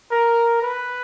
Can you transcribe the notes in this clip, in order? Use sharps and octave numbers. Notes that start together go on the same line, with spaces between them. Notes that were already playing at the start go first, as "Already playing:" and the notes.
A#4
B4